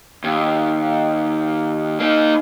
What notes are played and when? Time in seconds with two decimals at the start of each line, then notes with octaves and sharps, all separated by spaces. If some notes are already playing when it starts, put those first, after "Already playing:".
0.24 D#2
2.00 A#3 D#4